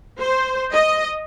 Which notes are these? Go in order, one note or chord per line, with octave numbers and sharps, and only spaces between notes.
C5
D#5